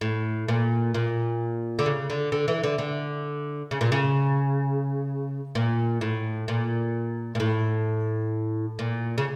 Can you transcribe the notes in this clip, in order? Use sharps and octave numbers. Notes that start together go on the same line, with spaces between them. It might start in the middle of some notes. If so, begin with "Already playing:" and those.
A2
A#2
A#2
D3
C#3
D3
D3
E3
D3
D3
C#3
A#2
C#3
A#2
A2
A#2
A#2
A2
A#2
C#3